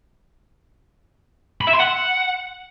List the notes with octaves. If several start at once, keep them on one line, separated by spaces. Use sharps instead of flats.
B5
E5
C6
F#5